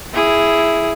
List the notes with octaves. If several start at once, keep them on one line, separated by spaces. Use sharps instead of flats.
E4 G#4